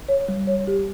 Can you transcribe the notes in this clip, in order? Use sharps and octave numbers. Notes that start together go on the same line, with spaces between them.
C#5
G3
C#5
G4